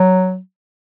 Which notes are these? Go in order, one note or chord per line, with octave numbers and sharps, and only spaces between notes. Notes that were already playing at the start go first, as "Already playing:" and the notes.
Already playing: F#3